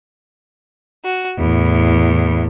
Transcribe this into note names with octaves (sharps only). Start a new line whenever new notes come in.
F#4
E2 A2